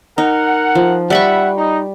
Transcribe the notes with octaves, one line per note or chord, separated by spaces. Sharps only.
D#4 A#4 F#5
F3
G3 E5 F#5 B5 C#6
D#4